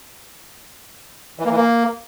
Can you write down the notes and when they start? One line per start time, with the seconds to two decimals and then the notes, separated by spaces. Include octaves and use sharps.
1.40 E3
1.45 A#3
1.51 E3
1.57 A#3